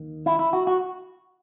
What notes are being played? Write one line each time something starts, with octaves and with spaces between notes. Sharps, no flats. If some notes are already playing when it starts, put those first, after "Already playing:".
Already playing: D#2 D#3
E4
E4
F#4
F#4